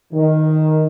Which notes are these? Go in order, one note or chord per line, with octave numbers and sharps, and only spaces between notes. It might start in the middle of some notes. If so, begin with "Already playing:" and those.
D#3